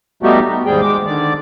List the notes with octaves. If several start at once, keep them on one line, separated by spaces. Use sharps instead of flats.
G3 A3 B3 D#4 F#4 G4
B3
D#2 G#2 G3 G#4 G5
G#3 D6
D3 D#3 D5 D6